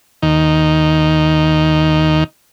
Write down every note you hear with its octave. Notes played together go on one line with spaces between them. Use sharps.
D#2 D#3 D#4